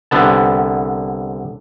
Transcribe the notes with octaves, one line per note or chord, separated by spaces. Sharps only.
C2 D3 B3 A5